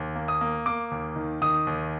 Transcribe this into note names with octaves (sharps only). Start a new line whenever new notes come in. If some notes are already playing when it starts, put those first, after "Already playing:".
Already playing: D#2
A#3
D#6
A#3
A#3 D6
D#2
D#3
D#3 D#6
D#2